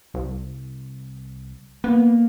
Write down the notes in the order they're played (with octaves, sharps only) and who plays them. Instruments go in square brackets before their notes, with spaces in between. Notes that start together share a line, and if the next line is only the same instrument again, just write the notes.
[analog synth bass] C2
[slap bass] A#3 [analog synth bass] B3